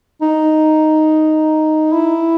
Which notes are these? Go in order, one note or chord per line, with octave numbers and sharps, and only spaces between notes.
D#4
E4